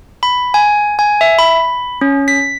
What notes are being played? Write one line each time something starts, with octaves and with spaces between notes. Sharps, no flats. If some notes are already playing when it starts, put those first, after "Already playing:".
B5
G#5
G#5
E5
B5
C#4
B6